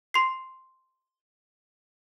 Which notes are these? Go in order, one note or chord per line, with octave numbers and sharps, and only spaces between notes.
C6 C7